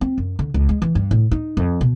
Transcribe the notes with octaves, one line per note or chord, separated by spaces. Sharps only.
C4
F#2
D3
C#2
G#3
E3
G2
A2
D#4
F2
B2